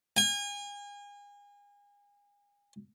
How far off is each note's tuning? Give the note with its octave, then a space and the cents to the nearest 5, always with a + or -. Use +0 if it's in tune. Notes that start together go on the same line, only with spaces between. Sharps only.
G#5 -35